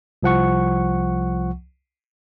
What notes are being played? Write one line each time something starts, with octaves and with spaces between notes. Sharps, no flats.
C2 F3 F#5 C#6